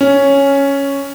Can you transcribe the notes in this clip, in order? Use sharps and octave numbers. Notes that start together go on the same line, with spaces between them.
C#4